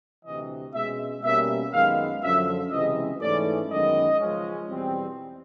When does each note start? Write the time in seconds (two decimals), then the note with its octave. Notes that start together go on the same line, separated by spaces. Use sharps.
0.25 D2 C3 E3 D#5
0.74 B2 G#3 C#4 E5
1.23 B2 G3 A#3 C#4 E5
1.73 F#2 D#3 G#3 B3 F5
2.22 F#2 D3 F3 E5
2.72 C#2 C3 E3 G#3 D#5
3.20 G#2 E3 A3 C#4 D5
3.71 F#2 D#3 G#3 B3 D#5
4.19 C#2 C#3 F3 G#3 C#4
4.68 E2 B2 G3 C4